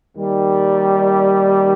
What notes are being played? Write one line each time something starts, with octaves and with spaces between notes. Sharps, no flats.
D#2 D#3 G3